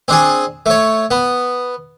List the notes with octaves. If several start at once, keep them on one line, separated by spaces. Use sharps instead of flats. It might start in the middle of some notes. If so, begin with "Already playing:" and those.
C4 D4 G#4
A3 C#5
B3